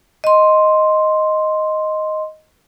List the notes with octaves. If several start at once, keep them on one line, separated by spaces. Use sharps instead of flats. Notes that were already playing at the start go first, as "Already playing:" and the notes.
D#5 C6